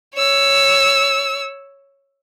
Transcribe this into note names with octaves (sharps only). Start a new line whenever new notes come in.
C#5 E6